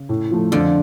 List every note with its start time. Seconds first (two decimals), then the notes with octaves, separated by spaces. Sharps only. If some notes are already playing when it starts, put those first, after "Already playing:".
Already playing: C#3
0.09 A2
0.31 F3 A3
0.52 F2 D3 F3